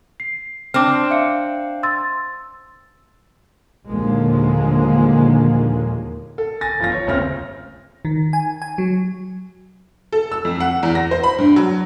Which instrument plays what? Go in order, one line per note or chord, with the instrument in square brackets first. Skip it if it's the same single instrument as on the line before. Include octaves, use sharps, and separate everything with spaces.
[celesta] C7
[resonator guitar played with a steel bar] C4 D4 [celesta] A5 D6 F6
[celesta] E5 F5 C#7
C6 E6 A6
[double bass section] D#2 A#2 D3 F3 G#3 A#3
[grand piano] A4
G#5 A6 A#6
G1 F3 F4 A#6
C#5
G1 D2 C#3 C4 F6 A#6
[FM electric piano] D#3
G#5
G#5
F#3
[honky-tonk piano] A4
E6
F2
F#5
E2
A#6
C5
B5
G2
F#3